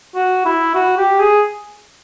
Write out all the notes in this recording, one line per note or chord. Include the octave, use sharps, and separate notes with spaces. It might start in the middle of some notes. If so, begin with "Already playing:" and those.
F#4
E4
F#4
G4
G#4